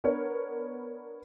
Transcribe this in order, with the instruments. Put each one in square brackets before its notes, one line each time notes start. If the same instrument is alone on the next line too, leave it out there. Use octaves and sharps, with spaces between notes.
[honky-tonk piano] B3 D4 A#4 B4 C#5